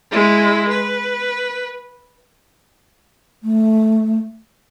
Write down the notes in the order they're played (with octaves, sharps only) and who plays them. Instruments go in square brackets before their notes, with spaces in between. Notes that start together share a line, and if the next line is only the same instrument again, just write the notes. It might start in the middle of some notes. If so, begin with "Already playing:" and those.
[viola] G#3 E4
B4
[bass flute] A3